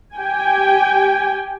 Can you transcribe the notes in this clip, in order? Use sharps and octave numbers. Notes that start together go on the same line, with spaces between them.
G4 G5 G#5